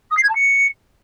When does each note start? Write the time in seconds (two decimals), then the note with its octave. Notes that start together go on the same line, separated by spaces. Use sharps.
0.11 D#6
0.17 C7
0.23 G#6
0.29 A5
0.35 C#7